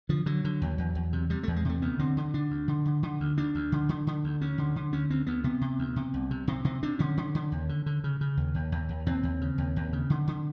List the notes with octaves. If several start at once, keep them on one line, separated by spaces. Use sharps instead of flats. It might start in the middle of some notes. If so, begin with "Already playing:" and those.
D3 F3
D3 F#3
D3
D#2
E2
E2
C3
C3 G3
E2 A3
G#3
C3 A3
D2 B3
D3 C4
D3
D3 D4
D2
D3
D3
D3
D2
D2 D4
D2
D3
D3
D3
D2
D2 C#4
D3
D3
D2 C#4
D2 C4
D2 B3
C3 B3
C3
D2
C3
C2
C3
C3 C4
C3 C4
C3 D4
D3 C#4
D3
D3
D#2
D3
D3
C#3
C#3
D#2
D#2
D#2
D#2
D#2 C4
D#2
C#3
D#2
D#2
C#3
D3
D3